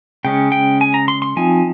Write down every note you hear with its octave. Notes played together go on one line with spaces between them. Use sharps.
C#3 G#3 C#4 G5
G5
G#5
A#5
C6
C6
F3 C4 D#4 G#5